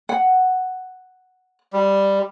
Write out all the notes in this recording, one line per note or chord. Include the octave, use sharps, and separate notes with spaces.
F#5
G3